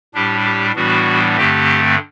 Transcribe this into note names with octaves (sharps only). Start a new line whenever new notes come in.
A2 G3 D4 G4
G4
A2 E3 G3 B3 D4 F#4
G2 D3 A3 C4 G4